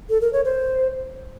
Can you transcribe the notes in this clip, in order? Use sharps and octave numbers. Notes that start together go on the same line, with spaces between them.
A4
A#4
C#5
C5